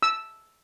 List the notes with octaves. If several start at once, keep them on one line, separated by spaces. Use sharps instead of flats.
E6